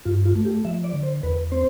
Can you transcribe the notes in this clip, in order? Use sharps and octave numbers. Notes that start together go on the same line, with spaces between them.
G2 F4
F4
A3
G4
F3 E5
D5
D3
C5
E2 B4
C4 C5